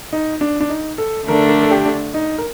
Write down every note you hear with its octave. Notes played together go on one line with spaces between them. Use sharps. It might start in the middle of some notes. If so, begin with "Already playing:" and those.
D#4
D4
D4
D#4
A4
D3 A3 D4 A#4
A#4
A4
G4
D#4
A#4